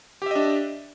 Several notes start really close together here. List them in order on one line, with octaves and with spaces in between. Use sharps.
G4 E5 D#5 D4